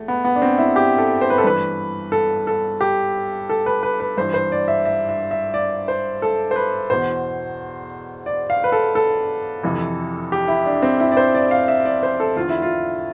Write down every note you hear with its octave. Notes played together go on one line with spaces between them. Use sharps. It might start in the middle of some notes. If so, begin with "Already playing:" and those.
Already playing: E2 A3
B3
B3
D4
C4
E4
G4
A4
C5
B4
A4
G2 E3 B4
A4
A4
G4
A4
B4
B4
B4
G2 E3 C5
C5
D5
E5
E5
E5
E5
D5
C5
A4
C5
B4
E2 B2 C5
D5
F5
B4
A4
A4
F2 C3 E3
G4
E4
D4
C4
E4
D5
C5
D5
F5
E5
D5
C5
A4
E2 D3 F4
E4
F4